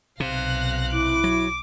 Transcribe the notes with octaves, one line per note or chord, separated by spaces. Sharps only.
B1 C3 F5 F#6 A#6
E4 D6
F#3